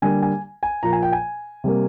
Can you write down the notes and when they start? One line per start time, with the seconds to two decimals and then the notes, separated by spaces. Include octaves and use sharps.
0.02 D3 G3 A#3 G#5
0.22 G#5
0.63 G#5
0.83 A#2 F3 A#3 A#5
0.93 G#5
1.03 G5
1.13 G#5
1.64 C3 G3 A#3